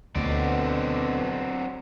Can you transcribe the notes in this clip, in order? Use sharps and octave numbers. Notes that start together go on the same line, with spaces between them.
D2 B2 D3 F#3 C4 B4 D5